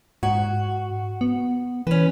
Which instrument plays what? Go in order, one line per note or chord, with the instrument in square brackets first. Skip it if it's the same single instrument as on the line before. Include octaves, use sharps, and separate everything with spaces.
[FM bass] G#2 [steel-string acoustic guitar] F#4
[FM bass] B3
[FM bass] E3 [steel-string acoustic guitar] C#4 B4